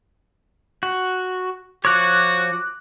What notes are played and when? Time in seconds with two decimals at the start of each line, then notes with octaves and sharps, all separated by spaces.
0.83 F#4
1.85 F3 F#4 C#5 D6 F#6